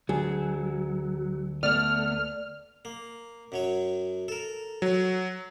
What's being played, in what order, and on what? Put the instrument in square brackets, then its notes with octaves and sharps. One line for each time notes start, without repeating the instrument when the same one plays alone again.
[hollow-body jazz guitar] D2 [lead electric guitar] F#3 [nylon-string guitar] G#4
[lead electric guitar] A3 B3 [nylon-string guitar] D5 [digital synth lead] F6
[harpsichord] A#3
F#2 F#3 C#5
A4 A#4
[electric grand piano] F#3